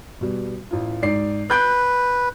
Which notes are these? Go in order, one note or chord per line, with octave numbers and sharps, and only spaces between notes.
B2 G3
A1 F4
G#2 D5 C7
B4 F#6 G6 D7